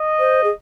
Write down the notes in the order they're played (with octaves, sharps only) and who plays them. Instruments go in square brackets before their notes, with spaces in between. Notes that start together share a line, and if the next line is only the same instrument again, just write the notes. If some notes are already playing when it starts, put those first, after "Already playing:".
Already playing: [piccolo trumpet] D#5
[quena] C5
G#4